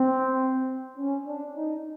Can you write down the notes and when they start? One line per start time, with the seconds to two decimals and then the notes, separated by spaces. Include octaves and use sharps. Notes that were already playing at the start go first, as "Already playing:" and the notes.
Already playing: C4
0.97 C#4
1.26 D4
1.55 D#4